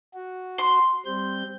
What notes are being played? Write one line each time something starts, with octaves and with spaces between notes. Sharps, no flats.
F#4
C6
G3 C4 G6